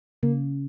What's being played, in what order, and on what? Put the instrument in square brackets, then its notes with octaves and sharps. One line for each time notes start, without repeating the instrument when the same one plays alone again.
[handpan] C#3 [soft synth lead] A#3